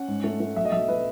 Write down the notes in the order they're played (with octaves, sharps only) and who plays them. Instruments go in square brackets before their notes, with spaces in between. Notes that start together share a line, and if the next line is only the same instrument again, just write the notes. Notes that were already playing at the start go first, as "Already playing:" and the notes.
Already playing: [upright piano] C#4 F#5
G#2
A3
A3
B1 E5
D#5
B1 E5
F#3 B4